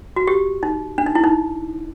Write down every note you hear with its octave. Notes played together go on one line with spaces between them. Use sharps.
F#4
G4
D#4
D4
D#4
E4
D#4